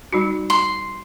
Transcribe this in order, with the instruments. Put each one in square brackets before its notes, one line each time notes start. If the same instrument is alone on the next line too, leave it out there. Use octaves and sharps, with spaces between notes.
[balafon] G3 D#4 F#4
[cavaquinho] C6